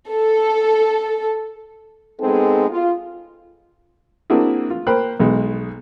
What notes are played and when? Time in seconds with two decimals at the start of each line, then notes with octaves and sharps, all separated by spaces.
0.11 A4
2.20 G#3 B3 C4 D#4 G#4 A4
2.69 F4
4.30 A#3 C4 D4 E4 F#4 G#4
4.70 F4
4.87 A#3 A#4 C5 G5 B5 F#6
5.20 B1 B2 G#3